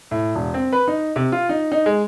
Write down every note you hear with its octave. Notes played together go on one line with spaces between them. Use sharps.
A2
E1
C4
B4
D#4
C3
F4
D#4
D#4
G#3